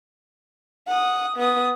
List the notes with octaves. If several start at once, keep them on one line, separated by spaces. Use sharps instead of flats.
F#5 D#6
B3 D#6